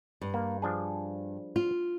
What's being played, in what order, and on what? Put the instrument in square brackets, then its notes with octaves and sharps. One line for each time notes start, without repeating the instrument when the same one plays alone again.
[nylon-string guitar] G2
[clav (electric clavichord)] A#3
F3 D4 G#4
[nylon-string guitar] F4